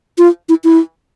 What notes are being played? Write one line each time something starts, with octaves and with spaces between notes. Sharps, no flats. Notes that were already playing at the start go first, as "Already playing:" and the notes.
F4
E4
E4